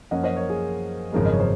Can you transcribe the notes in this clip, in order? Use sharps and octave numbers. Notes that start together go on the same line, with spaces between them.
F#2 F3 A#3 C#4 D#5 F#5
C5 D#5
A#4 C#5
G#4
G#1 F#2 C#3 F3 G#3 A#4
D#5
C#5
C5